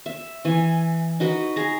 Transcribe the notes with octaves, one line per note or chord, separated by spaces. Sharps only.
E5
E3 G#5
D#4 F#4 B4
G#4 A#5